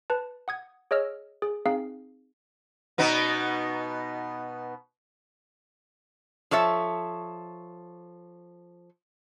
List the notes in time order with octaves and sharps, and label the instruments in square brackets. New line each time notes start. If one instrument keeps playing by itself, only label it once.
[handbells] B4 A5
F#5 D#6 G#6
G#4 C#5 D#5 E6 F6
G#4
C4 D#4 G#4 F5
[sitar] B2 B3 D#4
[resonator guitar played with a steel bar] F3 A4 C#5 E5